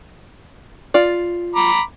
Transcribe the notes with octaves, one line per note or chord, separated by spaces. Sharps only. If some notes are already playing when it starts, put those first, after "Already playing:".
F4 D5
A#5 B5 D6